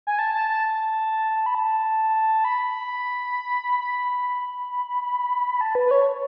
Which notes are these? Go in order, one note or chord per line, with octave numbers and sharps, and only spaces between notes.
G#5
A5
A5
A5
B5
A5
B5
B5
A5
B4
B4
C#5